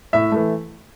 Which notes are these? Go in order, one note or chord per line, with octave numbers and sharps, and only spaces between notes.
A2 E5
E3 A3